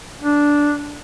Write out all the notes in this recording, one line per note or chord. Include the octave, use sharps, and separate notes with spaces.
D4